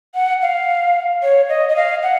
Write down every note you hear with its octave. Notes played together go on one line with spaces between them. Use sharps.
F#5
F5
C#5
D#5
D#5
F5
F#5